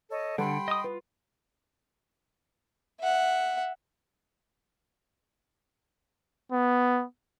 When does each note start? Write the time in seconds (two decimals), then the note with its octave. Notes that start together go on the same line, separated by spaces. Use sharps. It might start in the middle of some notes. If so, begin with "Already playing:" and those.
0.09 A4 C#5 D#5
0.38 D3 G3 A4 F#5 G5 B5 C6
0.68 D#5 D#6
0.84 F4 B4
3.00 E5 F#5
6.52 B3